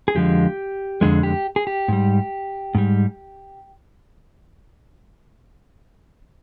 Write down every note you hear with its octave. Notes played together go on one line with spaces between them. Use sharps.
G#4
F2 D3 F3 G#3 G4
F2 D3 F3 G#3 G#4
G4
G#4
G4
G#2 G3
G#2 G3